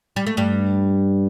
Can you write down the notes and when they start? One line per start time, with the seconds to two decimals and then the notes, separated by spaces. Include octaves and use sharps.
0.16 G3
0.26 A3
0.37 G2 G3